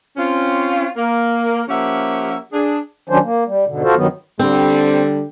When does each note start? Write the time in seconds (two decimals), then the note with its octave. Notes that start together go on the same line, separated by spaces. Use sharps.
0.17 C4 C#4 F4
0.97 A#3
1.68 F3 A#3 C#4 G4 E5 F#5
2.52 D4 G#4
3.09 D#3 F#3 C#4 D4 C5
3.23 A#3
3.47 G3
3.67 G#2 B2 D3
3.83 F4 F#4 A4 C5
3.96 G2 D#3 F#3 B3
4.39 D3 G3 C4